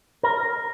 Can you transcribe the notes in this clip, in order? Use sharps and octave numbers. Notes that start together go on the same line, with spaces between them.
A#4